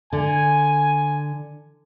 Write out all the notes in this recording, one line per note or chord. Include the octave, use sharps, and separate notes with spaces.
D3 G#5